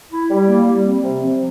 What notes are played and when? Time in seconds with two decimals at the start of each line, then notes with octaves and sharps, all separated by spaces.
0.12 E4
0.30 G3
0.49 A#3
0.67 G3
0.85 C4
1.04 C3
1.24 F3